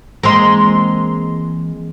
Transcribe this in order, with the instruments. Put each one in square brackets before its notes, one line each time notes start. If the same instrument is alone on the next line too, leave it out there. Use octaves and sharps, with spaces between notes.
[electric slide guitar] E3 G5 G#5 [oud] G#3 A#3 C4 [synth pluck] A#5 C6